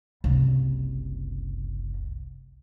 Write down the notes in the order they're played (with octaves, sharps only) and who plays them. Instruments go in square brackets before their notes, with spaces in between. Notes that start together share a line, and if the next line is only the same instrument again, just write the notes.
[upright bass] F#1 C2